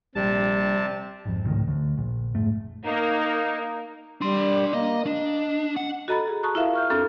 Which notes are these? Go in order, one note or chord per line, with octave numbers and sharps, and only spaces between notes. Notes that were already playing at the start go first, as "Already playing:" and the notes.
A#1 C3 G3 A5
G#1 F2
G#1 C#2 A2 D#3
D2
A#1
F1 G#2 A3
A#3 D#4
G3 D4 C6
A#3 D#5
D4 D#5
F#5
F#4 A4 D#5 A#5 B5 A6
G#4 A#5
A5 A#5 C#6 D#6 F#6
E4 F4 A#4 E5 F5
C#6 F6 G6
F#2 C4 D4 A4 F6